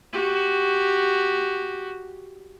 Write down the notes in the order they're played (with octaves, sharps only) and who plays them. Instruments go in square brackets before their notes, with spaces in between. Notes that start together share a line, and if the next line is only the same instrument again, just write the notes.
[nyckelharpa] F#4 G4